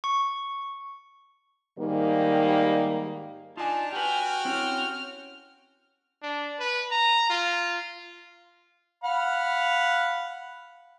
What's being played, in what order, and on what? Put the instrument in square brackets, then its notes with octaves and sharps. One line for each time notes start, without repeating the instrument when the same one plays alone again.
[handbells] C#6
[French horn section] G#2 D#3 G3 A#3
[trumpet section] D4 D#4 A5 [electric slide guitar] F4 G#5
[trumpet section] F#4 G5 [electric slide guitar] G4 B4 [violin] G#5 F6
[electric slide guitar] C4 E4 G4 [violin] C#4 F6
[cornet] D4
B4
A#5
F4
[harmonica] F5 F#5 B5